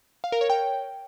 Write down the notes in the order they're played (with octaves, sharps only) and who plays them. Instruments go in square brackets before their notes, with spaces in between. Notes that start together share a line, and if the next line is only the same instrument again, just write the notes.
[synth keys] F5
A#4
C#5
G5